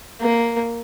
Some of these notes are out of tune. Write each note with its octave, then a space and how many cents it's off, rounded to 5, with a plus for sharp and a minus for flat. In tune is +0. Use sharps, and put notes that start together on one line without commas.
A#3 +0